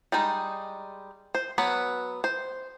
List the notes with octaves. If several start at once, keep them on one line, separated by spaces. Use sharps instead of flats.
G3 G#3 D#4
C5
F#3 B3 B4
C5